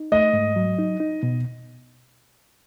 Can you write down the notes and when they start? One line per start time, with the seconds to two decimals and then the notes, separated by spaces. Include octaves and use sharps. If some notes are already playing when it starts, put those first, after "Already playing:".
Already playing: D#4
0.12 A3 D#5
0.33 G#2
0.56 F#3
0.79 D#4
1.00 D#4
1.23 B2